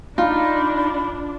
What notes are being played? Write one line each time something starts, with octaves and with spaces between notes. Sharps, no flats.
D4 D#4 F4 B5